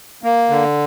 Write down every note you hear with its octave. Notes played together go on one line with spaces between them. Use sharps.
A#3
D3